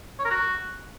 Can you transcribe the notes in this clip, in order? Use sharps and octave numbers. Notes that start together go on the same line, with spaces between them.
C#5
A#4
F#4